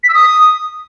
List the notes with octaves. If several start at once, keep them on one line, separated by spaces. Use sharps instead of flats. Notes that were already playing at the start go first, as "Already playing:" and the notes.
B6
E6
D#6